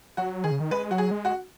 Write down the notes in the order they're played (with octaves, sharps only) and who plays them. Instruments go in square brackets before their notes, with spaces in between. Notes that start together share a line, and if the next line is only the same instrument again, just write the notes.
[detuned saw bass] F#3 [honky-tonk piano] F#4
[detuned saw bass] D#3 [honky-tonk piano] G#4
[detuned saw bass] C#3
D#3
[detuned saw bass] G#3 [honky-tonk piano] B4
[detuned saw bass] F#3 [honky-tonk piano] F#4
[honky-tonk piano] G#4
[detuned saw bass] G#3
[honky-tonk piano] F#4